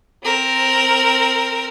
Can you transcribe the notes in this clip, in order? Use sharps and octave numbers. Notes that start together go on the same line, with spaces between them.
C4 A#4